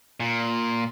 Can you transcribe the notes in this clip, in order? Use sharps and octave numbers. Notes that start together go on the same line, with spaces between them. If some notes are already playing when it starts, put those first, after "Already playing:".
A#2